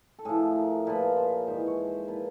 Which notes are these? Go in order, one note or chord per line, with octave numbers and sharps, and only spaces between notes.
A4
A2 F3 G#4
A#4
A#2 F3 B4
C5
G#2 E3 C5
C#5
C5
A#2 F3 B4